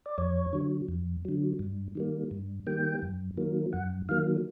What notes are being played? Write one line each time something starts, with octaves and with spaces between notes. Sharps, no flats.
D5
F2 C#5
D3 F#3
F2
D3 F#3
G2
D#3 G3 A#3
G2
D#3 G3 A#3 G5
F#2
D#3 F#3 A#3
F#2 F#5
D#3 F#3 A#3 F5